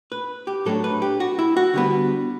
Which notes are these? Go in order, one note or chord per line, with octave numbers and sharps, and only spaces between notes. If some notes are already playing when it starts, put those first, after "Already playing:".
B4
G4
A2 F#3 A3 D4 A4
B4
G4
F#4
E4
F#4
D3 G3 B3